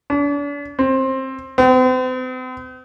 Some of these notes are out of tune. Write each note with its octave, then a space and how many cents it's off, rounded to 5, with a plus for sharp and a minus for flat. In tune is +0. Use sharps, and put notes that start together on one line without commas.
D4 -40
C4 +20
C4 -40